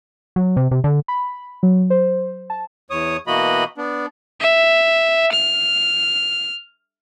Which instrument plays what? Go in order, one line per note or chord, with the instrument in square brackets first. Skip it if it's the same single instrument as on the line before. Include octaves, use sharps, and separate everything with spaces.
[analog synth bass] F#3
C3
C3
D3
[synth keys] B5
F#3
C5
A5
[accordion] E2 C#5 D#6
B2 E3 A#3 F#4 D#5 B5
B3 D4
[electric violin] E5
F6